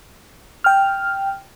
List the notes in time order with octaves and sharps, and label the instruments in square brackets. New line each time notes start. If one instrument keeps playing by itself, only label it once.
[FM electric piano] G5 F6